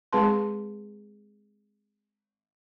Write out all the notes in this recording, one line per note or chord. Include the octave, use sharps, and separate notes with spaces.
G#3 C4 G#4 B4 A5 C6